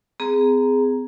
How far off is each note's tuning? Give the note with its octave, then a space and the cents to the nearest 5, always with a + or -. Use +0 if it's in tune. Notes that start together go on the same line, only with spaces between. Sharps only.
C4 -40 G#4 +0 A#5 +0